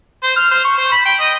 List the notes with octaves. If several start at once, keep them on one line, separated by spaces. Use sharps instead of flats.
C5
F6
C5
C#6
C5
B5
G5
D#5